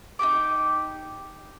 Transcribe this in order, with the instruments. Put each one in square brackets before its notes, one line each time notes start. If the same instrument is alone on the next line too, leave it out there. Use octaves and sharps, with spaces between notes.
[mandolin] D#4 E4 G4 D6